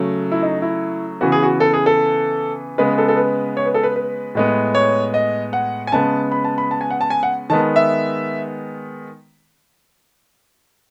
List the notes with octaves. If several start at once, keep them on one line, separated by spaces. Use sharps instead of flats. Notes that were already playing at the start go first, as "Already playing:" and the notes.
Already playing: C#3 F#3 A3
E4
D#4
E4
C#3 E3 B3 F#4
G#4
F#4
A4
G#4
A4
C#3 G#3 B3 B4
A4
A4
B4
C#5
B4
A4
B4
B4
A2 G#3 B3
C#5
D#5
F#5
G#5
C#3 G#3 B3 A5
B5
A5
B5
A5
G#5
F#5
A5
G#5
F#5
D#3 G#3 B3 A5
E5